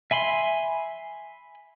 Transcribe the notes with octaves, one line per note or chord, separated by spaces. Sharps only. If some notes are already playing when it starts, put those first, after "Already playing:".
E5 G#5 B5 C6